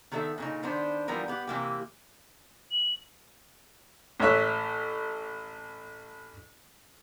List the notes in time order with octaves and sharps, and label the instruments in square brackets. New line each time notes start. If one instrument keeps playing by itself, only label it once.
[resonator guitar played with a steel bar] D#3 B3 A4 C5 E5
A#2 C#3 D#4
D#3 B3 D4 C5
E3 F3 G3 B3 A#4
B3 G4 F#5
C3 E3 A#3 G4
[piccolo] F#7
[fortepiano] A1 C#5 E5 F#6